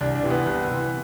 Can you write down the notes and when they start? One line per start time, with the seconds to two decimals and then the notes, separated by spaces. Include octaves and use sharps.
0.01 C2 D4
0.15 D4
0.23 C3 E3
0.30 B3
0.46 C2
0.68 C3 E3